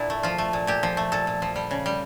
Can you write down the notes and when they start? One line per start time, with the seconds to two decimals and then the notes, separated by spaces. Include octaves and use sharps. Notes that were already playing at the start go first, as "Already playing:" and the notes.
Already playing: A#2 D4 E4
0.10 A3
0.23 F3 F4
0.38 A3
0.53 A#2
0.67 A#2 G4
0.83 F3
0.97 A3
1.12 A#2 A4
1.27 A#2
1.42 F3
1.56 G3
1.71 C#3
1.86 G3